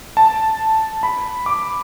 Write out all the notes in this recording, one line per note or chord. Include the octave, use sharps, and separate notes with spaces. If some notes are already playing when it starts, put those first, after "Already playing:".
A5
B5
D6